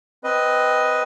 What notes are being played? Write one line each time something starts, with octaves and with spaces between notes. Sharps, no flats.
C4 B4 D#5